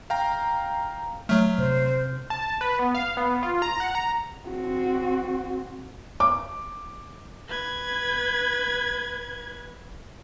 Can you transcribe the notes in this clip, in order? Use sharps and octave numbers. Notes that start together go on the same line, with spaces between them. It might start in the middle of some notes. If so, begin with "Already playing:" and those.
F5 G5 A#5
F#3 A3 F6
C3 C5
A5
B4
B3
F5
B3
F4
A#5
F#5
A#5
C4 F#4
D6
B4 G#6